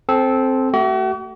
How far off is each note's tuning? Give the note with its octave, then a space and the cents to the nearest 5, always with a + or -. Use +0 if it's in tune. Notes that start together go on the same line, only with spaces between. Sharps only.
C4 +0 A4 -20
A3 +15 F#4 +45